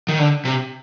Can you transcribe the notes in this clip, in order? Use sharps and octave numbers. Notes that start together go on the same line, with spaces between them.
D#3
D3
C3